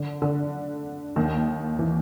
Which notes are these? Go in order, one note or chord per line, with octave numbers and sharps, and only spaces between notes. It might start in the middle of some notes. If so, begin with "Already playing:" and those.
Already playing: D3
D3
D#2 D#3
E3